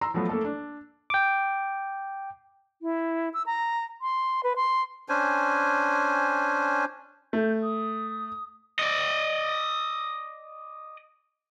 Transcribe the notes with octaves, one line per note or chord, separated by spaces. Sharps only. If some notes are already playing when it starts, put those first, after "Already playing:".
A#5 C6 E6
F3 F#3 A3 B3
A3 A#3 A4
D4
G5 D6
E4
E6
A#5
C6
B4
C6
C#4 D4 C5 G#5
A3 G6
D#6
D5 D#5